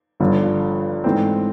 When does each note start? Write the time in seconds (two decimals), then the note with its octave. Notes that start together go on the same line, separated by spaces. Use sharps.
0.20 G1 G2 D3 F3
1.04 G#2 E3 A3 C4